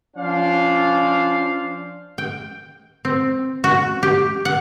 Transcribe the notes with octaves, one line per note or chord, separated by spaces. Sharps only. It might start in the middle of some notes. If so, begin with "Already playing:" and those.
F3 C#4 D4 C5 F5
G5
C4
F#4
G4
F#5